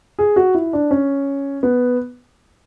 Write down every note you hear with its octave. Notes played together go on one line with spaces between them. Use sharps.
G#4
F#4
E4
D4
C#4
B3